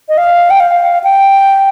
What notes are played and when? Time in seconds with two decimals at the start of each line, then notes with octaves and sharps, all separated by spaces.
0.09 D#5
0.18 F5
0.50 G5
0.60 F5
1.04 G5